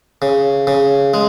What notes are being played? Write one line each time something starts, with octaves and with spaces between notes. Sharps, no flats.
C#3
C#3
G#3